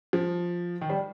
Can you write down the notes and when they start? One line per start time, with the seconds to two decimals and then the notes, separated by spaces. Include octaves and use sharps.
0.13 F3
0.81 D#3
0.90 G3